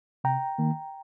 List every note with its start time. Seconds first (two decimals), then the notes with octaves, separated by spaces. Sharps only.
0.24 C3 G5 A#5
0.58 D#3 A#3